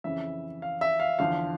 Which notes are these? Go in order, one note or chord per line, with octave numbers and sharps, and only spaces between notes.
F2 C#3 E3 E5
F5
E5
F5
E2 D3 F3 F5